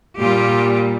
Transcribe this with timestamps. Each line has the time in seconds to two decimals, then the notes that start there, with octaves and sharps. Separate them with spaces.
0.19 A#2 G3 F4 G4